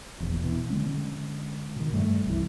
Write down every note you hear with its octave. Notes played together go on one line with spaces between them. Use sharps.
E1 A#1 E2
B2 E3
D3 F#3 G#3 C#4
B2 D#3
G2 G3 A3
C2 E3